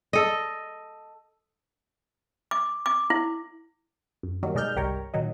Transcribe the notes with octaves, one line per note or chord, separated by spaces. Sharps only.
A4 D#5
D6
D6
E4
F#2
D#3 F#3 G3 A#3
B2 G#3 D#4 D5 F6 G6
G1 C2 G4 A#4 C#5
A#2 D#3 F#3 D#4